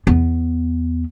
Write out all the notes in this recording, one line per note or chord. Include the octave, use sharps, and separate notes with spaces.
E2 B3